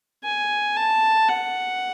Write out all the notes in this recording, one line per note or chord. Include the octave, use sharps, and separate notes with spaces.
G#5
A5
F#5